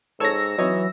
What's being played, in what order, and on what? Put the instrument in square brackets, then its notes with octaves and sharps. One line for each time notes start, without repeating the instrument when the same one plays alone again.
[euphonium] G#2 [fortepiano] A4 C#5 [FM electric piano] E6 A#6
[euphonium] E3 [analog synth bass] F#3 [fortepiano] D#4 C#5 D#5